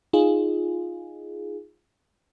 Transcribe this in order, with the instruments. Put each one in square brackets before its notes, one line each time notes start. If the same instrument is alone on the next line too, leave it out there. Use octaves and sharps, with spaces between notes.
[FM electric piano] D#4 F4 G#4